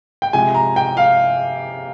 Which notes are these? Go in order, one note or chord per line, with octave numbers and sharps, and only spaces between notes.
G5
C3 F3 G#3 G#5
A#5
G5
F5